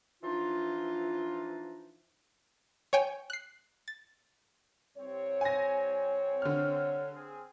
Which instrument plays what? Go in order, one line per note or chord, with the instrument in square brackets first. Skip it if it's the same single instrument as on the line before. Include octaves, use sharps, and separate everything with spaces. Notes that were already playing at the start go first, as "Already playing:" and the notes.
[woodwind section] E3 F3 D4 D#4 F4
[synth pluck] C#5 G5 G#5
F#6 C7
A6
[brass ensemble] C2 C4 C#5
[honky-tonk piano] G#5 A#6
D3 F6
[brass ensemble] C4 G#4